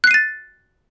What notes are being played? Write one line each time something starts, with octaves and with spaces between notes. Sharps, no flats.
F#6 A6 C7 D#7